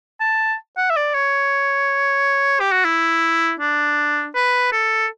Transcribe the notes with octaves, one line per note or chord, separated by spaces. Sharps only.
A5
F#5
E5
D5
C#5
G4
F#4
E4
D4
B4
A4